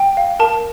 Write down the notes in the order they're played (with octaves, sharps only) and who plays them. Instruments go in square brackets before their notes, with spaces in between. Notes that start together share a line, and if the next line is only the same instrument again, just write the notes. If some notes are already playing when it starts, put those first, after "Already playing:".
Already playing: [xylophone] G5
F5
A#4 A5